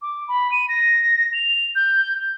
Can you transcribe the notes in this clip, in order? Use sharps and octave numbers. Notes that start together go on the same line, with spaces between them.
D6
B5
D#7
A#6
F7
G6